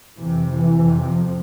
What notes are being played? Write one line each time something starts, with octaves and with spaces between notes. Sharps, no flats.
F2 C3 E3
E3
F2 C3
F3